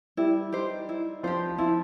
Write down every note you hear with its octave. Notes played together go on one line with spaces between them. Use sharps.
G3 E4 G4
D#4 G4 C5
E4
F3 F4 G4 C5
F3 E4 F4